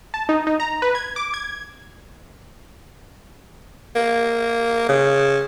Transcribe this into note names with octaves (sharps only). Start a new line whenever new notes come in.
A5
D#4
D#4
A#5
B4
G#6
D6
G#6
A#3
C#3